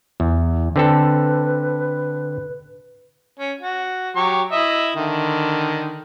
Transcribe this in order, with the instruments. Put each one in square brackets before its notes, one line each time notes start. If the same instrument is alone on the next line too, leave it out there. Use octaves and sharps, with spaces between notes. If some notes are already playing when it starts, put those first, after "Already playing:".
[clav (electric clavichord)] E2
[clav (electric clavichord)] D3 C4 A4 [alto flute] B4
[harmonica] C#4
F#4
F#3 G4 C#6
E4 D#5 E5
D3 D#3